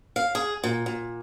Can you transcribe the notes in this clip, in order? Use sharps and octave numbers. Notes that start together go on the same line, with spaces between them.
F5
G#4
A#2
A#2